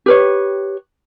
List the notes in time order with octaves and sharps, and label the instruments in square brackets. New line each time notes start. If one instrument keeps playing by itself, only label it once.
[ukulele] G4 B4 C#5